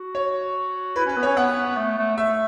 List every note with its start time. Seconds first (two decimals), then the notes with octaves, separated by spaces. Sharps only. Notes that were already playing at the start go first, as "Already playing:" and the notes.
Already playing: F#4
0.15 C#5
0.96 E4 B4
1.06 C#4 B4
1.16 B3
1.23 C#5
1.26 C#4
1.37 B3 F#5
1.76 A3
1.98 A3
2.17 A3 E5